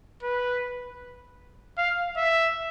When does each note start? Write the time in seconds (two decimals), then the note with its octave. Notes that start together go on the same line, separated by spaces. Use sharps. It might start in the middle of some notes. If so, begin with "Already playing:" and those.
0.23 B4
1.78 F5
2.17 E5